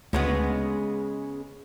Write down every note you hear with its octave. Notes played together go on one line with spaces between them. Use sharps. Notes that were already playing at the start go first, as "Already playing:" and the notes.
D2 C#3 G#3 B3